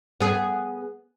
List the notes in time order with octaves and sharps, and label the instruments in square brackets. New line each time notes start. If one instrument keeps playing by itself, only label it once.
[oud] B3 G#4